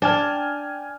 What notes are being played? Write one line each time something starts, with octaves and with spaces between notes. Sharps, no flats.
D4 G5 G#5 F6